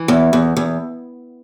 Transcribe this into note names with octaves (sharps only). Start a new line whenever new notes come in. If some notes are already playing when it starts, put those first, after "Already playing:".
Already playing: E3
E2
E2
E2